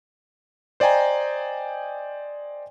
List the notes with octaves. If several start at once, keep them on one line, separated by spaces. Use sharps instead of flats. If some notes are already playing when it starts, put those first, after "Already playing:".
C5 D5 D#5 G5 G#5 A#5